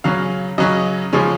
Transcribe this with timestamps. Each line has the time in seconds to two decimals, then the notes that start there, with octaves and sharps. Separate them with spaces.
0.04 C#3 F#3 C#4 F5
0.58 C#3 F#3 C#4 D#5
1.13 C#3 F3 G#3 C#4